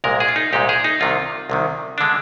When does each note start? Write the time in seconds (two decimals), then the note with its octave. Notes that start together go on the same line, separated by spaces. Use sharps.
0.04 C2 A#2 G#3 A#4
0.20 G#4
0.28 F4
0.36 D#4
0.53 C2 A#2 G#3 G4
0.69 G#4
0.84 D#4
1.01 C2 C3 D#3 F4
1.50 C2 C3 D#3
1.98 D3 G#3 D4